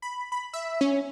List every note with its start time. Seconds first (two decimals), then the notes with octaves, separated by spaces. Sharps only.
0.02 B5
0.32 B5
0.53 E5
0.81 C#4